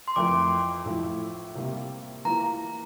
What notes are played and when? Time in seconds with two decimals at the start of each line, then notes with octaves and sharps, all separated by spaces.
0.08 C6
0.16 F2 E3 A3 E4 A#4 D6
0.85 A2 F3 A3 E4
1.55 C3 G3 A#3
2.25 E3 A#3 F4 A#5